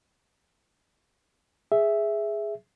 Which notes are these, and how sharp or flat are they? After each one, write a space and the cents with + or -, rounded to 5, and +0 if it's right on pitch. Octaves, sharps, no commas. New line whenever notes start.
G#4 +0 E5 +0